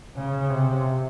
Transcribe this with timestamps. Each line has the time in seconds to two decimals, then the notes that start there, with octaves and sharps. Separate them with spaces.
0.16 C#3
0.50 C3